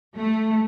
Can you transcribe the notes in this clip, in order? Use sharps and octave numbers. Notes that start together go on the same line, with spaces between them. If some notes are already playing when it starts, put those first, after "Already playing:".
A3